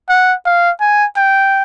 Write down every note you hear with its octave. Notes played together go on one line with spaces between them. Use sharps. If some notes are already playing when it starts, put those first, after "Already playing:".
F#5
F5
G#5
G5